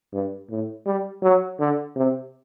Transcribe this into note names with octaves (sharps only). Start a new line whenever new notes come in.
G2
A2
G3
F#3
D3
C3